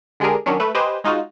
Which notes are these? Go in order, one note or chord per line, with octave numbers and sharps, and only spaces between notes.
D3 G#3 D4 G4 G#4 A#4
D#3 F#3 C#4 D4
A3 B4
G4 B4 C5 D#5 G#5
G#3 D#4 F4 F#4